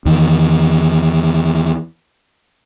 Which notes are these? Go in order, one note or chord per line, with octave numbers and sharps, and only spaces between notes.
E2 D#3